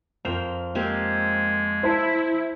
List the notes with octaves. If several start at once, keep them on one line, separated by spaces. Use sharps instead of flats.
F2 A#4 C5 G5 F7
G#3 A#3 C4 G4
E4 C5 A5